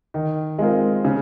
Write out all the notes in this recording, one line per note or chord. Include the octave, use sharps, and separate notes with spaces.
D#3
G#3 C4 F4 A#4
C#3